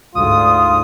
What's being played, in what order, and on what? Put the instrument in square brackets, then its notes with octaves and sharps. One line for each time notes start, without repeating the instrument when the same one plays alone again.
[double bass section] D2 G#2 [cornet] F4 [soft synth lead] D#6